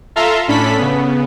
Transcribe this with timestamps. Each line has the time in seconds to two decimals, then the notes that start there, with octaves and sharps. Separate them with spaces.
0.16 F4 A4 E5 F5 A#5 C6
0.48 A2 C#4 D4 A4 B5 B6
0.78 C#3 B3